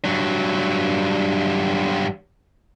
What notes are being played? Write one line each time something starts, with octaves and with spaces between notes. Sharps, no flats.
G2 F#3